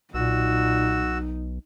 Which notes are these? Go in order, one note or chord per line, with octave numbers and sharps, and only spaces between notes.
B1 A#2 D#4 F#4 E6